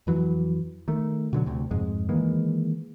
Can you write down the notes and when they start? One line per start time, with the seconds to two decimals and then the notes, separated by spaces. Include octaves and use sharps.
0.07 F2 E3 F#3
0.88 D#3 A3
1.33 B2 D3 F#3
1.46 D2 C3
1.71 F2 G#2 G#3
2.09 D#3 E3 G#3 A#3